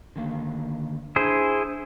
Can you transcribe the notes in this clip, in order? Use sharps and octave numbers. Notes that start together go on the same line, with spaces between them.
D3 D#3 A#3
D4 E4 G#4 C5